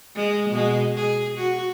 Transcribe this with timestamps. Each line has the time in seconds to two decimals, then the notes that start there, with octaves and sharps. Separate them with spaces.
0.15 G#3
0.50 B2 G#3
0.96 G#4
1.38 F#4